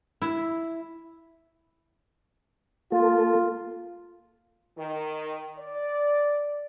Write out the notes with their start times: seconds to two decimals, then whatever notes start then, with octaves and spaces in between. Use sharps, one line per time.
0.22 E4
2.92 A#3 F4 A4
4.77 D#3
5.58 D5